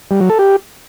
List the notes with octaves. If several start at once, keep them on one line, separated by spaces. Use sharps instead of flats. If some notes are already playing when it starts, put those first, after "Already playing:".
G3
F#3
A4
G4